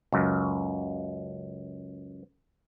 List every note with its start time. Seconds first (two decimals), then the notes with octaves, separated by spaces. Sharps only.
0.12 C#2 F#2